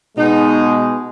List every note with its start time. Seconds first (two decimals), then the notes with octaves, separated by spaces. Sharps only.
0.17 B2 G#3 D#4